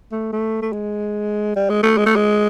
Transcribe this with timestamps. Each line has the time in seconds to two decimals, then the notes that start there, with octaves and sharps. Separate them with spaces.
0.12 A3
0.32 A3
0.62 A3
0.73 G#3
1.56 G3
1.70 G#3
1.83 A3
1.97 G#3
2.06 A3
2.16 G#3